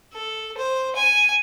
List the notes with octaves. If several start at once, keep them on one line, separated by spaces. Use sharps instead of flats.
A4
C5
G#5